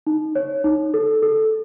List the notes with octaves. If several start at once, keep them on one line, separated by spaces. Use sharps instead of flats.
D#4
C#5
D#4
A4
A4